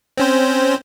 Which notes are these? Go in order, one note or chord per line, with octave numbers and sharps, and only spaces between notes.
C4 C#4 C5